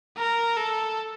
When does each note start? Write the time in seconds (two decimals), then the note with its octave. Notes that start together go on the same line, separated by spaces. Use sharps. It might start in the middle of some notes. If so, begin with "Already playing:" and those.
0.17 A#4
0.57 A4